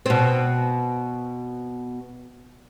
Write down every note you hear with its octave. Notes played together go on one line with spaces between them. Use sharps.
B2 C4